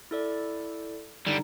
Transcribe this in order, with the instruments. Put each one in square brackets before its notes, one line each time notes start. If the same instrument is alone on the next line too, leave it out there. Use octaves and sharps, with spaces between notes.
[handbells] E4 A4 D5
[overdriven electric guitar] D3 G3 [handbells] D#4